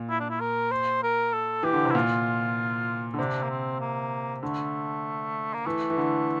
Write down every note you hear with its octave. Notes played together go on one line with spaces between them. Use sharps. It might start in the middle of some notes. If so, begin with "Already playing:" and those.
Already playing: A#2
E4
D4
E4
A#4
C5
A#4
A4
E3 G4
D3
C3
E4
A#2 F4
D3
C3 D4
A#3
C4
A#3
D3 A3
A#3
E3 A3
E3
D3